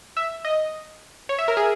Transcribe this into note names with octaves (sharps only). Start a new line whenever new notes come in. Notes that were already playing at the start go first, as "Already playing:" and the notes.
E5
D#5
C#5
E5
A#4
G#4